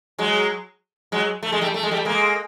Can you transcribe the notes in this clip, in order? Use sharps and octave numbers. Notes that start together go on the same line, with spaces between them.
F#3 G#3
F#3 G#3
A3
G#3
G3 A3
A3
G#3
G3 A3
G#3 A#3